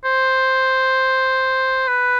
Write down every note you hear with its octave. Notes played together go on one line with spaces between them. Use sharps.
C5
B4